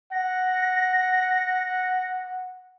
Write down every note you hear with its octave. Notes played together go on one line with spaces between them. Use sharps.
F#5 A#6